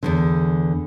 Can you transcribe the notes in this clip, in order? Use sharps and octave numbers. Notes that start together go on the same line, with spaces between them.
E2 G#2 D3